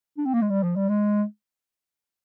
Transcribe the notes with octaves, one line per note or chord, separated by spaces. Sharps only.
D4
C4
A#3
G#3
G3
F3
G3
G#3